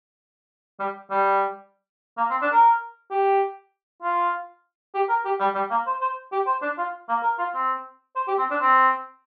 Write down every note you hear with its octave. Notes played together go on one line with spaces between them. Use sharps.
G3
G3
A#3
C4
D4
A#4
G4
F4
G4
A#4
G4
G3
G3
A#3
C5
C5
G4
C5
D4
F4
A#3
A#4
F4
C4
C5
G4
C4
D4
C4